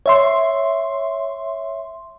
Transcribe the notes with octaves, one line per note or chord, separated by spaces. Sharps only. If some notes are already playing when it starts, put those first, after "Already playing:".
C#5 E5 C6